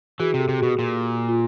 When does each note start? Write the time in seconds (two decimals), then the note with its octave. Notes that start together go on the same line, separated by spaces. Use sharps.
0.20 E3 F#4 G#4
0.34 C3
0.39 G4 A4
0.49 C3
0.58 B2 F#4 G#4
0.79 A#2
1.28 F4